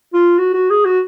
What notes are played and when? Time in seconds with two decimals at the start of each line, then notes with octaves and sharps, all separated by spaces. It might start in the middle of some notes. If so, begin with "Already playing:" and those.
0.14 F4
0.38 F#4
0.54 F#4
0.70 G#4
0.85 F#4